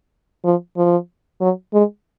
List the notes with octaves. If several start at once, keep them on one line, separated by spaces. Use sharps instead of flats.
F3
F3
F#3
G#3